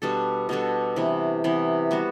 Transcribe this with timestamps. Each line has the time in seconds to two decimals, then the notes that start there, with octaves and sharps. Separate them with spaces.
0.02 B2 G3 D4 A4
0.49 B2 G3 D4 A4
0.96 C3 E3 B3
1.44 C3 E3 B3
1.91 G3 B3 F#4